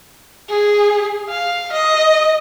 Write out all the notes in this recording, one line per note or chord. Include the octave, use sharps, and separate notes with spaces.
G#4
F5
D#5